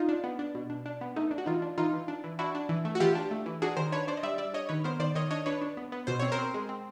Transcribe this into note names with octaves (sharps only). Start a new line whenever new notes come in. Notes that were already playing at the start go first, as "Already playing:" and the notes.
Already playing: D#4 F4
D4
B3
D4
B2
D4
D4
B3
A3 D#4
D4
F#4
E3 D#4 F4
D4
E3 D#4 F4
E3
D4
E3
D4 E4 F#4
D4
E3
A3
F#4
E3 F4 G4
D4
A3
E3
D4 F#4 G#4
D#3 A#4 C5
D4 B4 C#5
D4 C5 D5
D#5
G3 D5 E5
G3 D5 E5
D4 C#5 D#5
D#3 B4 C#5
B3 A#4 C5
D#3 C5 D5
D#3 C#5 D#5
D4 C#5 D#5
D4 B4 C#5
D4
B3
B3
B2 C5
C4 C#5
A#4 C5
C4
G#3
C4